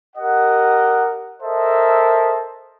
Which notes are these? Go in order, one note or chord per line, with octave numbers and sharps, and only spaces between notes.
G4 A#4 D#5 F#5
A4 A#4 C5 D#5 E5 A5